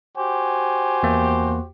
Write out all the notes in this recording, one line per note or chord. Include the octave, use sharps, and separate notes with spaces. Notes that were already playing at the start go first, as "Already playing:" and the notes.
F#4 G4 C5 G#5
E2 A#3